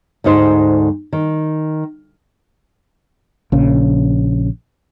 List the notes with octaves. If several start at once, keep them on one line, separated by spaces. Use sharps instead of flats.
D2 G#2 D#4 C5
D#3
A#1 C#3